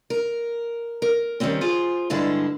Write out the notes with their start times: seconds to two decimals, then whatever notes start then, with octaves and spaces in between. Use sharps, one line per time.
0.10 A#4
1.02 A#4
1.40 D#3 G3 G#3 C4 C#4
1.61 F4 G#4 C5
2.10 G2 D3 G#3 E4 A5